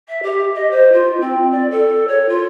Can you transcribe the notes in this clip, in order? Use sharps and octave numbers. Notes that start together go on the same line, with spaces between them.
E5
G4
D#5
C5
F4
C4
D5
A4
C#5
F4